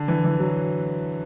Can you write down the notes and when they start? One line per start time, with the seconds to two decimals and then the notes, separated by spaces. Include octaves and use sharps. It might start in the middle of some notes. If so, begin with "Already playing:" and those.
Already playing: D3
0.08 E3
0.24 E3
0.40 F#3